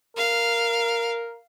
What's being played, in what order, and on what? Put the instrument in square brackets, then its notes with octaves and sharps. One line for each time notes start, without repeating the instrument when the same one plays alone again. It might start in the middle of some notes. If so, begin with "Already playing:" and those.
[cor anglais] A#4 [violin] F5